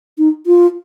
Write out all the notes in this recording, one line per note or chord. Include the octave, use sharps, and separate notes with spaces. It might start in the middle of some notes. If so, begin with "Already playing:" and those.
D#4
F4